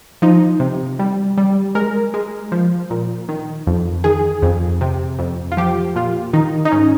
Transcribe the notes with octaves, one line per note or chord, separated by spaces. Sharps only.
F3 D#4
C3
G3
G3
G#3 A#4
G#3
F3
A#2
D#3
F2
D#3 G#4
F2
C3
F2
F4
F3 G4
A#2 F4
D#3 D#4
D#4
G#2 C#4